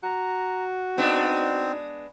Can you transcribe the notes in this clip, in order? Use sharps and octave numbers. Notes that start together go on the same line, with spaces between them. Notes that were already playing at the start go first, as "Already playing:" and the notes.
F#4 A#5
G#3 B3 C4 D4 D#4